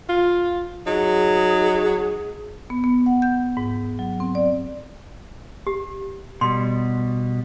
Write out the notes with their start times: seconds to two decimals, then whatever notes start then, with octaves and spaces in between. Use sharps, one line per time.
0.09 F4
0.87 F#3 D#4 G#4
2.70 B3
2.84 B3
3.06 F#5
3.22 G6
3.57 G#2
3.99 F#3
4.20 C4
4.35 D5
5.67 G4
6.41 B2 G3 C6